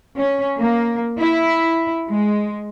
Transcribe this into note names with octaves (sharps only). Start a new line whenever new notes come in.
C#4
A#3
E4
G#3